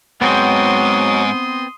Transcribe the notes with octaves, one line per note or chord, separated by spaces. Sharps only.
G#2 F#3 B3 C4 C5 C6 D#6